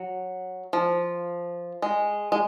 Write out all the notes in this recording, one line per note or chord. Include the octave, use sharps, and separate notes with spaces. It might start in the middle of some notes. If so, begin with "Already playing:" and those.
Already playing: F#3
F3
G#3
G#3